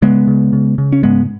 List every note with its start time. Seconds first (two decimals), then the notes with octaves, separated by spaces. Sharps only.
0.02 C#3 G#3 B3
0.27 C#3
0.53 C#3
0.78 C#3
0.93 C#4
1.03 G#2 G#3 B3